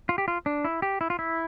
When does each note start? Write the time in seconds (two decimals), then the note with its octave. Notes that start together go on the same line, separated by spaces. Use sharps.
0.09 F4
0.18 G4
0.28 F4
0.46 D4
0.65 E4
0.82 G4
1.01 E4
1.10 F4
1.19 E4